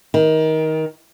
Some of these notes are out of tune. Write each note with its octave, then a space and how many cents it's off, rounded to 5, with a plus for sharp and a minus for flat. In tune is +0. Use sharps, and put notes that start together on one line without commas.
D#3 +20